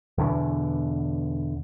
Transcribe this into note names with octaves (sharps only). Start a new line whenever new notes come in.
E2 B2 D3